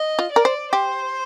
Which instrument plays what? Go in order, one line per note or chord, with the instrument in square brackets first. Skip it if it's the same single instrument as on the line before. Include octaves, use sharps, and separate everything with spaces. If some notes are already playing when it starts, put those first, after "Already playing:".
Already playing: [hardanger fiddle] D#5
[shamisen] F4
[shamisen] A#4 [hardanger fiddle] D5
[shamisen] C5
[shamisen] G4 [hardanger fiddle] C5